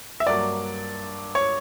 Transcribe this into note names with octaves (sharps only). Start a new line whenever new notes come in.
E5
G2 F#3 A#3 D5
C#5